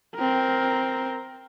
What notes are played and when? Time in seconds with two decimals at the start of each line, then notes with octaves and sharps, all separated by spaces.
0.16 C4 A#4